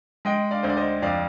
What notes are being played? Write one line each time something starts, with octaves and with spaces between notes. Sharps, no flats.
G#3 D#5 G5
D5 F5
D2 C5
D5
C5 D#5
F2 D5 F5